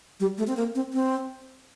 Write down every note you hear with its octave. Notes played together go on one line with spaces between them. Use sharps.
G3
A3
C4
A#3
C4
C4